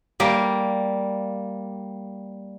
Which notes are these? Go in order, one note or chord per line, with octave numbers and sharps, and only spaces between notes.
G3 A#3